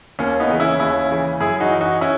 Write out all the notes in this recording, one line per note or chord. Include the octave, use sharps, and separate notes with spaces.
D#2 A#3 C#4
B3 D#4
C#3 E3
C#4 E4
D#2 C#4 E4
C#3 E3
F#2 E4 G#4
D#4 F#4
E3
D#4 F#4
C#4 E4